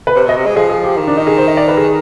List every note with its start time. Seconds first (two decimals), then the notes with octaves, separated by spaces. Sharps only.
0.07 B4
0.15 C3 C5
0.26 B2 D#5
0.36 C3
0.46 G#3
0.56 F3 G#4
0.70 G#4
0.84 G4
0.97 D#3
1.07 D4
1.17 D#4
1.27 G#4
1.38 C5
1.48 D#5
1.57 D5
1.68 B4
1.77 G#4